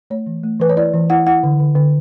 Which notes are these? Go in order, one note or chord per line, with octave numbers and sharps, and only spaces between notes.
A3 C#5
E3
A3
E3 B4
C#5
E4 D5
E3
E4 F#5
E4 F#5
D3
D3
D3